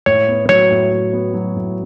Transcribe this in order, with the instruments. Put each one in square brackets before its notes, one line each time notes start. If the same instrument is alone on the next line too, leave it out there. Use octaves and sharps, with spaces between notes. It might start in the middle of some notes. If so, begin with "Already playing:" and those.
[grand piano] A2 [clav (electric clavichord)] C#5
[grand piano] B3
[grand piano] F#3 [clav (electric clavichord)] C#5
[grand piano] A2
A2
B3
F#3
A2